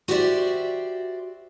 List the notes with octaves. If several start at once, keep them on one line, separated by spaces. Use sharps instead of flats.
F#4 G4 C5 D5 E5